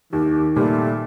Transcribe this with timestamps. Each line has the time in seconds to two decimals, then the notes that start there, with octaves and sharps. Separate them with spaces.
0.13 D#2 D#3 G4
0.56 A#2 G3 A3 B4